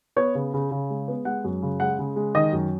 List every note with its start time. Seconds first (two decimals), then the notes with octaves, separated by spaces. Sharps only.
0.16 B3 C#5
0.35 C#3
0.54 C#3
0.71 C#3
0.90 G#3
1.08 B3
1.25 G#3 F#5
1.44 F#2
1.62 C#3
1.80 G#3 F#5
1.99 C#3
2.16 G#3
2.35 D#3 D#5
2.52 F#2